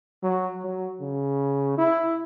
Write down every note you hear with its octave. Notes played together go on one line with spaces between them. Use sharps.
F#3
F#3
C#3
E4